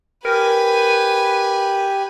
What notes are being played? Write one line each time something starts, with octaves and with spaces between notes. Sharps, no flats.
G4 A#4 B4 G#5